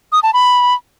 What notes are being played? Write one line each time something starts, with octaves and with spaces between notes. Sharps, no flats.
D#6
A5
B5